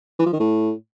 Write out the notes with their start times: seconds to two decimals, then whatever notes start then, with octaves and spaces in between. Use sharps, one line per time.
0.19 E3
0.26 F3
0.33 D#3
0.40 A2